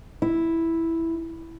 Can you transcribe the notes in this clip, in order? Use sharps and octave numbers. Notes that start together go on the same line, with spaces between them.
E4